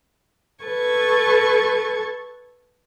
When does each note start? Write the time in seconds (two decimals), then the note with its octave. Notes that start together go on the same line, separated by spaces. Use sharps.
0.64 A4 B4 A5 C#6 G#6